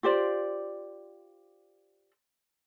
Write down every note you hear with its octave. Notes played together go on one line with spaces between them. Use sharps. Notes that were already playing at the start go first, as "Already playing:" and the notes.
F4 G4 C5 D5